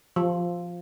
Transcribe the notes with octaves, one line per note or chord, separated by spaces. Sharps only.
F3